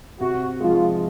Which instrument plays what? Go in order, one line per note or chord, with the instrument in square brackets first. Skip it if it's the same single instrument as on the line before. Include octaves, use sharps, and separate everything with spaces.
[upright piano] C3 [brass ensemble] F#4
[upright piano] F3 G#3 [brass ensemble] F4